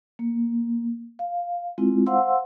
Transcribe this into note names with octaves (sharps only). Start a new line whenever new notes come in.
A#3
F5
G#3 C4 E4 F4
C5 F5 F#5 C6 E6